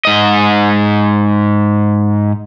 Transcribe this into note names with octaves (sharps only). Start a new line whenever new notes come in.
G#2 D#5